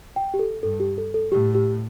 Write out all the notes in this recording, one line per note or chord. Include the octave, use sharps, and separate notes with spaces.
G5
G4
A4
G2 A4
G4
A4
A4
A2 G4
G4